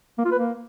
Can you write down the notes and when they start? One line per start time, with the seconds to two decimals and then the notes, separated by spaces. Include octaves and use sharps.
0.18 A#3
0.25 F4
0.32 B4
0.39 A#3